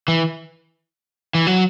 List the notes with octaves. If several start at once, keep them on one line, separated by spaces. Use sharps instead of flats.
E3
E3
F#3